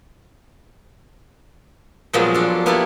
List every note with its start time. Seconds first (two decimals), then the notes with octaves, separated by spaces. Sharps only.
2.13 A#2 F3 F#3 G#3 B3
2.34 D4 A4
2.66 A#3 B3 D4 E4 G4 A4